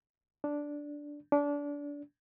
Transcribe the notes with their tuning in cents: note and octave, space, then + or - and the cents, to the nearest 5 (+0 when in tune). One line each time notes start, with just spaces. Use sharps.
D4 -5
D4 -25